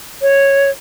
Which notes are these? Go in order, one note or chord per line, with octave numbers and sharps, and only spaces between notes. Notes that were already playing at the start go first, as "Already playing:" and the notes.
C#5